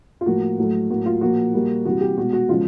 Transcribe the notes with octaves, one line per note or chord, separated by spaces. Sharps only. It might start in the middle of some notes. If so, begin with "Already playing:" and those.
F4
A2 F3 A#3 F#4
A2 F#3 A3
A2 F#3 A#3 F#4
F4
A#2 F3 A#3 F#4
A#2 G3 A#3
C3 E3 G3 F#4
G4
B2 G#3 F#4
F#4
C#3 F3 G#3 F4